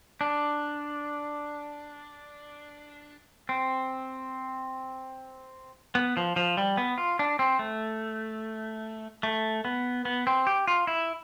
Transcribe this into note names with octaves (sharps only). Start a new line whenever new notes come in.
D4
C4
B3
F3
F3
G3
B3
F4
D4
C4
A3
A3
B3
B3
C4
G4
F4
E4